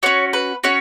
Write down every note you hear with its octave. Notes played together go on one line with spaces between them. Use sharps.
C#4 F#4 C#5
B4
C#4 F#4 C#5